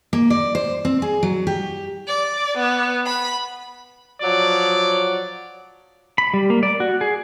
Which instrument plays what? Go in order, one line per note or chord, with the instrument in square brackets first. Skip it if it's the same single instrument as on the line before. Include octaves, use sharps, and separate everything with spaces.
[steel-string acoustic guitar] A#3
D5
C5
C4
G#4
F#3
G4
[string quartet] D5
B3
B5
[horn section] F3 F#3 D5
[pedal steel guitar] B5
G3
A#3
D5
F#4
G#4